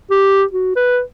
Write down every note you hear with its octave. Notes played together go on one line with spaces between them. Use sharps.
G4
F#4
B4